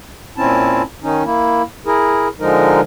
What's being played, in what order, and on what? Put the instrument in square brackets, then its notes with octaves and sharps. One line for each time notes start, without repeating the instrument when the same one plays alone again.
[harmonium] A#2 C4 C#4 E4 A5
D#3 C#4 D#4
A#3 E4
E4 G#4 A#4
D3 F3 G#3 D#4 A#4